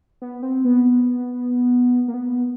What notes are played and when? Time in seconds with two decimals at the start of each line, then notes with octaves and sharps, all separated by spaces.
0.22 B3
0.43 C4
0.65 B3
2.08 A#3
2.14 B3